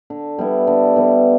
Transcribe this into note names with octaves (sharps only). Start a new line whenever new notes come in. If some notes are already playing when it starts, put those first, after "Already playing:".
D3
G3 B3 E4
D3
G3 B3 E4